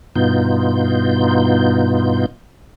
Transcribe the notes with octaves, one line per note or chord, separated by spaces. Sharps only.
G2 B2 B3 D#4 F4 G6